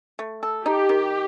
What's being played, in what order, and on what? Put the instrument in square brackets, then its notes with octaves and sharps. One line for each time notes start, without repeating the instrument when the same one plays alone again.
[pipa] A3
A4
[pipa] D#4 [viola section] G4
[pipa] D#3